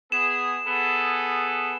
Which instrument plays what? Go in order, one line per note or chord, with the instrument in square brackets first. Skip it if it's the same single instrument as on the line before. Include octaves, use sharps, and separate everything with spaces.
[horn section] B3 G#4 [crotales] E7
[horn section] B3 G#4 A4